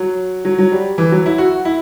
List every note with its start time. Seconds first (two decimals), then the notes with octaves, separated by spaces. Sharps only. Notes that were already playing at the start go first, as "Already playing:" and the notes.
Already playing: F#3
0.45 F#3
0.58 F#3
0.72 G3
0.98 E3
1.12 F#3
1.26 E4
1.38 F#4
1.65 E4